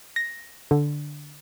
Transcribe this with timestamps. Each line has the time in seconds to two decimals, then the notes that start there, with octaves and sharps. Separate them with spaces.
0.16 A#6
0.71 D3